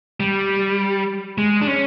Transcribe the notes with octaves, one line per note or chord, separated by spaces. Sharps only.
G3
G#3
D4
C#4